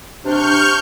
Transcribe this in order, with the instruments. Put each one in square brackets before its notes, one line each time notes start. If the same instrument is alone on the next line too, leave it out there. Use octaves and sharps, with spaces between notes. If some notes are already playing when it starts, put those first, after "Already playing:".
[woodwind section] C3 D4 [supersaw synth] C#6 F6 G6